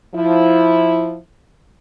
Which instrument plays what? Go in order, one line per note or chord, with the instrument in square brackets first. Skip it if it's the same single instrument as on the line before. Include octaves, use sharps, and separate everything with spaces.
[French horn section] F3 E4